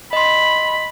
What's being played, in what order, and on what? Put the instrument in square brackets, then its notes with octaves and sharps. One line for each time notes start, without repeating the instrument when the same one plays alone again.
[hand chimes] D#5 C6 [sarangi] B5